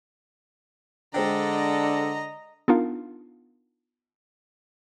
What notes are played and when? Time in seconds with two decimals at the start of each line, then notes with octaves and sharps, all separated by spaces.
1.14 D3 G#3 D4 A4 C5 D#5 G5 A#5
2.68 B3 D4 D#4 F4 A#4 F5